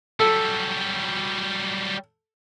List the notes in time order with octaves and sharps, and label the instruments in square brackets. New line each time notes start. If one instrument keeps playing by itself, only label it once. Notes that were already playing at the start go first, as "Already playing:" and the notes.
[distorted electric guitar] F#3 G3 [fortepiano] A4